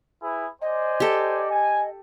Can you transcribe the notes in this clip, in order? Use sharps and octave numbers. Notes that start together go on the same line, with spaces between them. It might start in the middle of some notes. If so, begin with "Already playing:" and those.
E4 G#4 B4
C5 D5 D#5 G#5
G4 A4
G#5